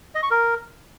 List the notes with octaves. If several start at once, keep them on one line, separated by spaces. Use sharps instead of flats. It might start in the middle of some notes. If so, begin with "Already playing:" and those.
D#5
C#6
A#4